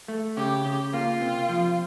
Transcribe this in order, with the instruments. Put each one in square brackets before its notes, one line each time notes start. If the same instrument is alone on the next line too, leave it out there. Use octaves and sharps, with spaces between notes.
[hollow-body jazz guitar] A3
[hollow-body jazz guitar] C#3 [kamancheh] G4
[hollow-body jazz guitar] C#3
[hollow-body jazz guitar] A#3 [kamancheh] F4
[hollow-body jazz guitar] C3
F3